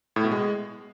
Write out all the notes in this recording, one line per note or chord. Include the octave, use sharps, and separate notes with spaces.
A2
B2
G#3